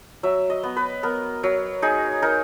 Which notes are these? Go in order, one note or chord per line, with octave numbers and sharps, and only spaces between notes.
F#3 E5
D#5
B3
B4
B3 A#4
F#3
D#4 G#4
D#4 A#4